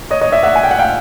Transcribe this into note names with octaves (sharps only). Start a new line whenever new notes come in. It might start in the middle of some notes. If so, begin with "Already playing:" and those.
C#5 D#5
C#5 D#5
D5 E5
E5 F#5
G#5
G5
F#5
F5 G5